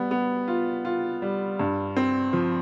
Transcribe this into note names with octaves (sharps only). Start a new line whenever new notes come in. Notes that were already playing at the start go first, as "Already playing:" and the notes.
Already playing: G3 B3
B3
F4
F4
G3
G2
C4
F3